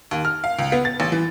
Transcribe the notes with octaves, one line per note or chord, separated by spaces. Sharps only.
D#2
F6
F5
C#2
B3
A6
A1
E3